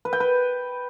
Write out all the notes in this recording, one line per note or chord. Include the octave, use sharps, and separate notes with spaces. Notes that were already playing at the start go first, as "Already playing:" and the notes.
B4
G5
B4